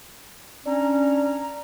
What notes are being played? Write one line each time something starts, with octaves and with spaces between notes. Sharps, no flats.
C#4 D4 A#5